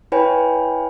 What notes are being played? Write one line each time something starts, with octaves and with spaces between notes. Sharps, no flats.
E4 B4 C#5 G5 G#5 B5